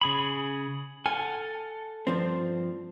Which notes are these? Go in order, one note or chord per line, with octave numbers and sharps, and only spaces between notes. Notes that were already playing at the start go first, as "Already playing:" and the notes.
C#3 G#4 B5
A4 F#5 G#5 F6
G2 F3 C4